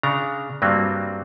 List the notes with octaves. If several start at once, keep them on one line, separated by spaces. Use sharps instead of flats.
C#3 D4 A#5
G2 F#3 G3 A#3 C4